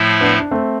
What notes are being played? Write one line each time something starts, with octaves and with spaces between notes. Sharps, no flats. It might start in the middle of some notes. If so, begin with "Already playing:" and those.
Already playing: A2 F3 A3 E4
B3 D4
D4
A3 C4